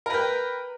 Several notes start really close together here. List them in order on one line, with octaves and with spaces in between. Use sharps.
A#4 B4 G5